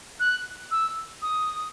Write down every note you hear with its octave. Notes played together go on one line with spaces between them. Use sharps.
F#6
E6
D#6